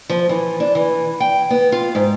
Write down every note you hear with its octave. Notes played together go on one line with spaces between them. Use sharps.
F3
E3
D4
E3
G5
B3
F4
G#2